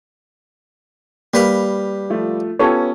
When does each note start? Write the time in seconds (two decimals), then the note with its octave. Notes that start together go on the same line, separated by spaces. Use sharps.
1.34 G3 A#3 B4 F5
2.10 F3 A3 F4
2.59 B3 C#4 F4 G4 A4 C#5